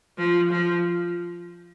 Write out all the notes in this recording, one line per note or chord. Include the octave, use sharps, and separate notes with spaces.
F3
F3